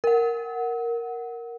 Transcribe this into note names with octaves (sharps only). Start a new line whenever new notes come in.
A#4 F#5